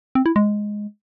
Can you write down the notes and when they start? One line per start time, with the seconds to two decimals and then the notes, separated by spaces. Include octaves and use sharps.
0.15 C4
0.26 E4
0.36 G#3